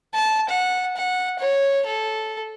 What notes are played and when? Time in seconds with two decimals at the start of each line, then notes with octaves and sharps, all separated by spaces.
0.15 A5
0.49 F#5
0.96 F#5
1.39 C#5
1.86 A4